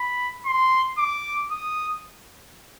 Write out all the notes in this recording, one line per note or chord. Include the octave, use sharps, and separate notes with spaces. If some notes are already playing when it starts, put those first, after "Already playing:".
Already playing: B5
C6
D6
D#6